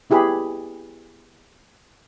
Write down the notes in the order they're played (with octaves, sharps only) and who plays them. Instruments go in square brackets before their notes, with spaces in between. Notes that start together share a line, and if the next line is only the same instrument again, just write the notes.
[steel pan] B3 E4 G4 G#4 B4 B5